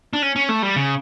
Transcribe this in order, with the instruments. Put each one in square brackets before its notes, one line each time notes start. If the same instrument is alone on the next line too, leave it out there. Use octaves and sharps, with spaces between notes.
[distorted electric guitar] D4
C#4
C#4
A3
G3
C#3